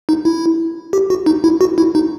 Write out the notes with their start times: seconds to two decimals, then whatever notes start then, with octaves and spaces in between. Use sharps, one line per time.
0.09 D#4
0.25 E4
0.93 G4
1.10 F#4
1.26 D#4
1.44 E4
1.61 F#4
1.78 E4
1.95 D#4